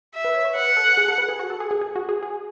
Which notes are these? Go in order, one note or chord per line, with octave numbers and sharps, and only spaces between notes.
E5
B4
C#5
C#5
B4 F#5
A4
G#4
A4
B4
G#4
F#4
A4
G#4
G#4
G#4
F#4
G#4
G#4